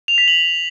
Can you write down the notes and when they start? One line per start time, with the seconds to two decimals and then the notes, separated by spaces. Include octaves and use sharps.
0.08 F7
0.18 B6
0.28 F#7